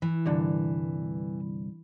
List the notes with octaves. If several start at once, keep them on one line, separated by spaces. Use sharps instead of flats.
E3
C2 G2 D3